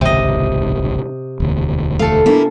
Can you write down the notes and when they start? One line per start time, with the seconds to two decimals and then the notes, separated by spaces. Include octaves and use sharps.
0.01 D#1 G#1 C#2 C3 D#5
1.40 E1 D2
1.99 A3 A4 F5
2.26 A#3 B3 D4 E4